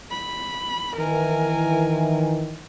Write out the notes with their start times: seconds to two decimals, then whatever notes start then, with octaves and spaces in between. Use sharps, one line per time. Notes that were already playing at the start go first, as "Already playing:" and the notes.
0.11 B5
0.97 D#3 E3 A#4 G#5